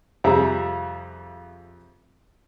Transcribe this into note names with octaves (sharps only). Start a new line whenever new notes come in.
F2 C3 G3 G#4 E5 A#5